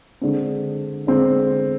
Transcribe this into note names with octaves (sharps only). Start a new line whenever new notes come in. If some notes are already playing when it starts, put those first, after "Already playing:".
D3 G#3 C4
D3 G#3 C4